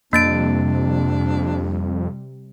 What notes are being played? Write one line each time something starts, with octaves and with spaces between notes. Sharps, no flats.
F2 C3 G3 A#3 D4 A6 D7